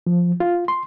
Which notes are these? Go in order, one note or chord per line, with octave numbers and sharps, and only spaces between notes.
F3
F4
C6